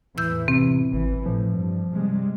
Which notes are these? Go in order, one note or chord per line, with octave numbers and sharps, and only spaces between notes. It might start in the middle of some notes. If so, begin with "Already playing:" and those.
E2 A2 E3 E6 G6
C3 C4
G#1 E3
A2 F3
G2
C3 G3 G#3